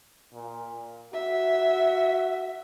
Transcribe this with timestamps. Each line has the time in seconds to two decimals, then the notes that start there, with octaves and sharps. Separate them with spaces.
0.33 A#2
1.13 F#4 E5